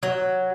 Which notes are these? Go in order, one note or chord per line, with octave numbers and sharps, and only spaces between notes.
F#3